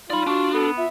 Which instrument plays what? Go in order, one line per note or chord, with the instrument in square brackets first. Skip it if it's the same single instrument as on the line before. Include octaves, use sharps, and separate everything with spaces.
[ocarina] D#4 [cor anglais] F4 [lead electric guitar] D5 B5
[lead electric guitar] D4 [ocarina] F#4 [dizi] C#6
[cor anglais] B3 [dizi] A4
[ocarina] F4 [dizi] E5